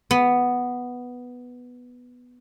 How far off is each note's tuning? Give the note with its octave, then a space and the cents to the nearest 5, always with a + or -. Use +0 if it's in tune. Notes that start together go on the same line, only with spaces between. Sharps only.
B3 +0